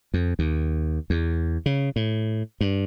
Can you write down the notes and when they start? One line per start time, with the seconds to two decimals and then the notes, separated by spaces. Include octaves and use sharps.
0.14 F2
0.39 D#2
1.10 E2
1.66 C#3
1.96 A2
2.61 G2